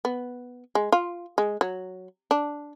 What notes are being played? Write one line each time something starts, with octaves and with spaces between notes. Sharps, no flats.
B3
G#3
F4
G#3
F#3
D4